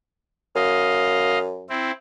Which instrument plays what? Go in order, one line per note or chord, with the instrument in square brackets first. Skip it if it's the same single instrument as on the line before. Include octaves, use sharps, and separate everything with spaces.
[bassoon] F#2 [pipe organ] D#5 F5
[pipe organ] C4 E4